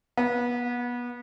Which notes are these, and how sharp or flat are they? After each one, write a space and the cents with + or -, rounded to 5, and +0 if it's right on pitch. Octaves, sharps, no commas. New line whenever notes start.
B3 -25